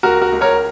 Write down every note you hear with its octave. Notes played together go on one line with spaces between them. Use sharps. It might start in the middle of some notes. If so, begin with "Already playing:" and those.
C#2 F#4 A#4
F#4 A#4
C#2
A#4 C#5